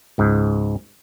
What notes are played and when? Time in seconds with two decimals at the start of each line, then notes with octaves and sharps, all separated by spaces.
0.18 C#2 G#2